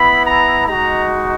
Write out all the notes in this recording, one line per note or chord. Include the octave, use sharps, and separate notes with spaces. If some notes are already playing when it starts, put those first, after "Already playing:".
Already playing: B3 E4 B5
A#5
G#3 D#4 F#4 A#5